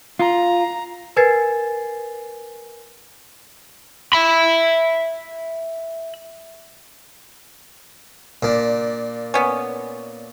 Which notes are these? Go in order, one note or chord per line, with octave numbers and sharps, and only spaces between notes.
F4 A#5
A#4 B4 G#5 G#6 A6 C7
E5 B5
A#2 D4
B3 C#4